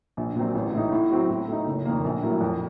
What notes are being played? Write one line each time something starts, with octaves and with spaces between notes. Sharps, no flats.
A#1
A#2 F#3 C4
A1
A2 A3 D#4
A2
F#3 C4 F#4
A2
A3 D#4
F#1
F2 D#3 A#3
A#1
A2 F#3 A#3
F2